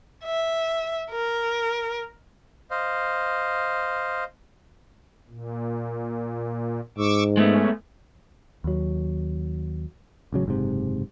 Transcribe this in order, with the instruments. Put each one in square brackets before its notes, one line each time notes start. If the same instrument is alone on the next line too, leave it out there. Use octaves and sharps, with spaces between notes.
[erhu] E5
A#4
[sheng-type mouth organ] C5 D#5 F5
[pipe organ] A#2
[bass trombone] G#2 [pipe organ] C#6 D6 E6
[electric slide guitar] G#3 A3 B3 [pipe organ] C#4
[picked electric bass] D#2 F#3
A1 C#3 F#3
F#1 G#2 C3